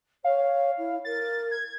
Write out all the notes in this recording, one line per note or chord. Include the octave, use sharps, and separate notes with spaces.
C#5 F5
E4
A#4 A6
G#6